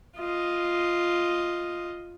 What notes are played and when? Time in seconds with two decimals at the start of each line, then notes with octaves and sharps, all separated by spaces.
0.18 F4 D#5